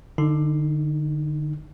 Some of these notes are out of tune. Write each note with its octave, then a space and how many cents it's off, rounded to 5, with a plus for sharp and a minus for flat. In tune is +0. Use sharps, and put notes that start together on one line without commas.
D3 +30 D#4 +0